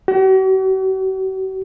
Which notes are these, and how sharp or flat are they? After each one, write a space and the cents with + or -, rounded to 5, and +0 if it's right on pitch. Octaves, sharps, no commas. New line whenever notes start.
F#4 +45